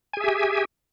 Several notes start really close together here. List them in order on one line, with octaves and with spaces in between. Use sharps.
G#5 G#4 E5 G4